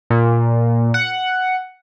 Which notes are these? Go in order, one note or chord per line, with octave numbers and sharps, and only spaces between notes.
A#2
F#5